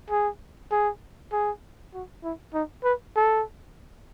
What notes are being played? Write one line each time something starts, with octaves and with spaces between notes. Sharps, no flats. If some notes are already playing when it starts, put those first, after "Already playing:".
G#4
G#4
G#4
F#4
E4
D#4
B4
A4